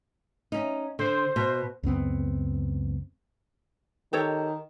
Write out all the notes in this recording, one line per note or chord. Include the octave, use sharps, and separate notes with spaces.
C#4 D#4
D3 C5
B2
C#2 F#2 B3 C4
D#3 G4 A4 C#5